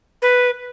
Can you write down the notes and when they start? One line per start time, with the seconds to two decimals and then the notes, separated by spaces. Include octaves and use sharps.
0.22 B4